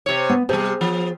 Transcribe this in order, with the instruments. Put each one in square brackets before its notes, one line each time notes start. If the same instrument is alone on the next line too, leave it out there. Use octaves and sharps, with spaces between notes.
[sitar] C3 C#5
[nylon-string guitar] B3
[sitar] C3 G3 [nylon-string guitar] G#4 C5 A5
[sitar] F3